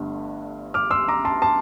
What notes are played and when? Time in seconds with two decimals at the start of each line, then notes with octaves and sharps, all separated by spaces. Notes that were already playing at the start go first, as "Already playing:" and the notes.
Already playing: G1 G2 D3 A3
0.74 D6 F6
0.91 C6 E6
1.08 A#5 D6
1.25 A5 C6
1.42 A5 C6